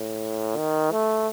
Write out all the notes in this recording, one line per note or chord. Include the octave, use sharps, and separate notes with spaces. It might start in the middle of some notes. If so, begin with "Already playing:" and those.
Already playing: A2
D#3
A3